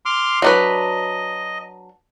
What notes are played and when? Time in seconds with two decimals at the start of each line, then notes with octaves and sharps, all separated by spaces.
0.06 C6 D6 F6
0.42 F#3 D4 B4 D#5